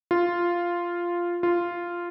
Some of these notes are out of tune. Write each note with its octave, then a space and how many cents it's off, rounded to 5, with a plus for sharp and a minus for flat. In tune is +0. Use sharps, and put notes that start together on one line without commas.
F4 -5
F4 -10